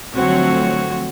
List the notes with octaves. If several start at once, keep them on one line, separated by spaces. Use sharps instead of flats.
D3 F3 F#3 A3 C4 F#4 C#5